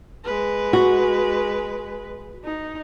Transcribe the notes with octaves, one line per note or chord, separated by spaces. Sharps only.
G#3 B4
F#4
D#4